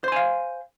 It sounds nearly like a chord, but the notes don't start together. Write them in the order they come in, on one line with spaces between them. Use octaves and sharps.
C5 C6 G#5 F5